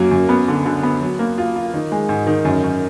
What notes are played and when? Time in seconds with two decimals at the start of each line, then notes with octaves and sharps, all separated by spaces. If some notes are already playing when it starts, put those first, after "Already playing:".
Already playing: F#2 F#3 A#3
0.11 F#2
0.29 B3
0.48 D3
0.66 D3
0.83 B3
1.01 F#3
1.19 A#3
1.38 F4
1.56 F4
1.74 D#3
1.92 G#3
2.09 G#2
2.27 D#3
2.45 F#2
2.63 F#2